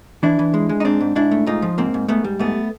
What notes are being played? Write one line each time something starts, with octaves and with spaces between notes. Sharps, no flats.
E3 D4 E4
E3
G#3
G#3
D#4
G#2 C4 D4
G#2
G#2 D4 E4
A3
G#2 D#4 F4
F3
G#2 A#3 C4
G#2
G#2 A3 B3
G3
G#2 A3 B3